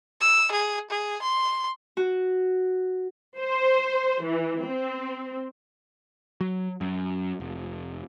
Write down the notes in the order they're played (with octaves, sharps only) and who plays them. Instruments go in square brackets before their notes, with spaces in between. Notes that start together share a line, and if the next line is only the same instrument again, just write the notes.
[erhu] E6
G#4
G#4
C6
[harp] F#4
[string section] C5
E3
C4
[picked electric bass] F#3
F#2
F1